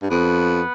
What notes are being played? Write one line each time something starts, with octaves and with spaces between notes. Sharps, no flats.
G2
F2 B3